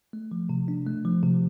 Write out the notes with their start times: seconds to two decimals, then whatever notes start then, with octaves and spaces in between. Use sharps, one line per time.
0.13 A3
0.32 F3
0.49 C3
0.68 D4
0.86 A3
1.05 F3
1.23 C3